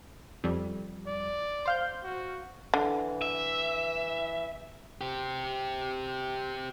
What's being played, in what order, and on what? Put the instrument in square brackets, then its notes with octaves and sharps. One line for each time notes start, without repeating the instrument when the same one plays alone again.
[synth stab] F2 G3
[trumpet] D5
[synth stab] C5 F5 G6
[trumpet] F#4
[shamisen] D3 [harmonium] E3
[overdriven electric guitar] E5
[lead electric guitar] C4 G4